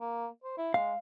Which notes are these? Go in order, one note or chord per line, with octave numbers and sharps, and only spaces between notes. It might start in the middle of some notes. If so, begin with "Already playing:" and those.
A#3
C5
E4
G#3 F5